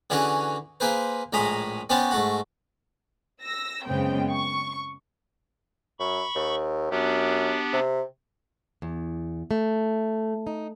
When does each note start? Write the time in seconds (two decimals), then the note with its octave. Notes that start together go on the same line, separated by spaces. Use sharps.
0.10 D3 E3 C#4 F#4 G#4
0.80 A#3 G#4 B4 C5
1.33 A#1 A2 G#3 A#5 B5 D#6
1.90 B3 C#4 F#4 G4 C5 D5
2.11 G#2 A3 F#4
3.43 E6 A#6
3.86 F#2 C#3 G#3 B3 C4 G5
4.31 C#6
6.00 F#2 B5 C#6
6.35 D#2
6.91 F#2 B3 D4 G4
7.73 C3
8.82 E2
9.51 A3
10.47 D#4